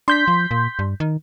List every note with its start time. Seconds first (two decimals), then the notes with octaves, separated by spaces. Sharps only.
0.08 D4 C6 G6 B6
0.28 F3
0.51 A#2
0.79 G2
1.00 D#3